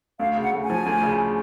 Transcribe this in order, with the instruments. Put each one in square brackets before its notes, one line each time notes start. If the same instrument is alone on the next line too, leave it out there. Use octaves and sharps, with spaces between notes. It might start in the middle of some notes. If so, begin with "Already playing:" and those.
[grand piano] D2 [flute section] F5
[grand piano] C#3
[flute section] F#5
[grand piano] D2
[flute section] G#5
[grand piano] F3
D2
C#3